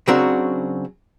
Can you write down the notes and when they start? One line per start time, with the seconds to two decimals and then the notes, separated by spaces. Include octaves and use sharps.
0.07 C#3 F#3 C4 D4 F#4 A#4